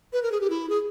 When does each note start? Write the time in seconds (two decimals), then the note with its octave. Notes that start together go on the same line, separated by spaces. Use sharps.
0.13 B4
0.23 A#4
0.32 G#4
0.41 G4
0.50 E4
0.69 G#4